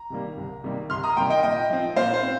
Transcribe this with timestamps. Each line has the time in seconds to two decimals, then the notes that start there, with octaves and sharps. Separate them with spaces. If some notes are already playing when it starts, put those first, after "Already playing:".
Already playing: A#5
0.10 C3 D#3 G3 A#3
0.37 C2
0.64 C3 D#3 G3 A#3
0.90 C2 C6 F6
1.03 A#5 D#6
1.17 C3 D#3 G3 A#3 G5 C6
1.30 D#5 G5
1.43 A#2 D#5 G5
1.70 F3 C4
1.96 A#2 C5 F5
2.14 C5
2.23 C4